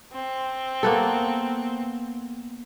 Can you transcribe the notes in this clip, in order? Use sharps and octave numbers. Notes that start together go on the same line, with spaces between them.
C4
A#3 B3 A4